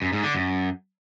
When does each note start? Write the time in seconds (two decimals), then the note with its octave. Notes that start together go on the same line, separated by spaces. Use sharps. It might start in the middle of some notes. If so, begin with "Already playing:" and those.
0.02 F#2
0.13 G#2
0.24 D3
0.35 F#2